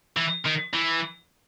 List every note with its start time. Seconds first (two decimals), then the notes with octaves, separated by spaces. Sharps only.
0.17 E3
0.45 D#3
0.73 E3